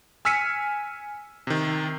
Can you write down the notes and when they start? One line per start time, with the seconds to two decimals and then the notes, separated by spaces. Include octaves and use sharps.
0.25 G#5 E6 F6 B6 C#7 D#7
1.47 C3 D#3